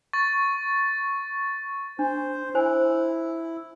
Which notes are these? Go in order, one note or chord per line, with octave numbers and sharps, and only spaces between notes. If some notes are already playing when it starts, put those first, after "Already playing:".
C#6 A6
D4 C5
E4 C5 G#5